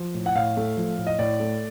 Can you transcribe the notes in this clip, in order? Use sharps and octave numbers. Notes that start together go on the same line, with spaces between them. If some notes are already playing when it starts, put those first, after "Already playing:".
Already playing: F3
A2
F#5
A2 F5
A3
F3
A2
D#5
A2 D5
A3